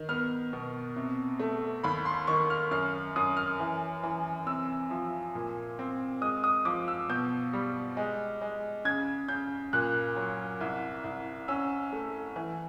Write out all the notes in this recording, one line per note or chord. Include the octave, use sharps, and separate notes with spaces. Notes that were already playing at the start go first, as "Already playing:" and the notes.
Already playing: D#3
B3 F6
B2
C3
A3
D#2 B5
C6
D#3 C#6
F6
F#2 F6
F#2 D#6
F6
E3
E3
C3 E6
F3
A#2
C4
G#3 D#6
D#6
F3 D6
E6
B2 G6
G3
G#3
G#3
C#3 G#6
C#3 G6
A#2 F#6
F#3
C2
C2
C#4 E6
A3
E3